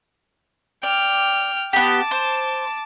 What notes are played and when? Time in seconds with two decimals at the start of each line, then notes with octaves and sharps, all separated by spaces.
0.83 D5 G5 F6
1.73 B3 G4 A5 D6
2.11 C5